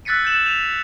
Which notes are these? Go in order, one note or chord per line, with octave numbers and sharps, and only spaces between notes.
E6 F#6 A6 B6 C#7 D#7
F#6 G6 D#7 E7 F#7
D#7 F7